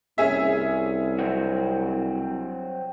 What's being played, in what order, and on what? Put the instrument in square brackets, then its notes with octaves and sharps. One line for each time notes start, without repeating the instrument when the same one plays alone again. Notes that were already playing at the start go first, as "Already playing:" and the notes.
[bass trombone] C2 [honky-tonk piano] C#4 G#4 E5
[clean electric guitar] F#3 C4 F#4